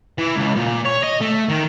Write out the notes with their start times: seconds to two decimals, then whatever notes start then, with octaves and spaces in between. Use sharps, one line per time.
0.18 E3
0.36 C#2
0.56 A#2
0.85 C#5
1.03 D#5
1.21 A3
1.48 D#3